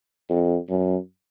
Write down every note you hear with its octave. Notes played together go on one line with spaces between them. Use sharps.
F2
F#2